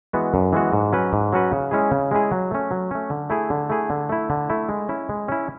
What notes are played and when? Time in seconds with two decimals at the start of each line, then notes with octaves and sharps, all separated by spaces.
0.13 E3 G#3 B3 F#4
0.34 F#2
0.53 E3 G#3 B3 F#4
0.73 G#2
0.93 F#3 C#4 F#4 B4
1.13 G#2
1.33 F#3 C#4 F#4 B4
1.52 C#3
1.71 G#3 C#4 E4 G#4
1.91 C#3
2.11 G#3 C#4 E4 G#4
2.32 F#3
2.51 A3 C#4
2.71 F#3
2.91 A3 C#4
3.10 D3
3.30 A3 E4 G#4
3.50 D3
3.70 A3 E4 G#4
3.90 D3
4.09 A3 E4
4.30 D3
4.50 A3 E4
4.69 G#3
4.89 C#4 E4
5.09 G#3
5.28 C#4 E4